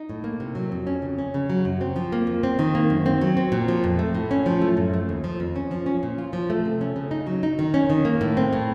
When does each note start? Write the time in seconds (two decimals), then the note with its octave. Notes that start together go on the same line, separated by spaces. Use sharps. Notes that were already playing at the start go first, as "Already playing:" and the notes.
Already playing: D#4
0.09 A2
0.24 A#3
0.40 C3
0.55 F#3
0.72 F2
0.87 C#4
1.02 C#3
1.19 C#4
1.34 C#3
1.50 F#3
1.65 F#2
1.81 C4
1.96 F3
2.12 A#3
2.27 F2
2.43 C4
2.59 D#3
2.75 A#3
2.90 F#2
3.06 C4
3.21 F#3
3.37 C4
3.52 A#2
3.68 F3
3.84 F2
3.99 A3
4.15 A2
4.31 C#4
4.46 F3
4.62 A3
4.77 F#2
4.94 A3
5.09 D#2
5.24 F3
5.40 F2
5.56 C#4
5.71 F3
5.86 C#4
6.03 A#2
6.18 F4
6.33 F3
6.50 A3
6.65 C3
6.81 C#4
6.96 C#3
7.11 D#4
7.27 F#3
7.43 D#4
7.59 D#3
7.74 C#4
7.90 D#3
8.05 A#3
8.21 A2
8.37 C4
8.53 A2